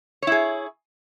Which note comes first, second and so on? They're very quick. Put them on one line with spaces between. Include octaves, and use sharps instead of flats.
C#5 E4 G#4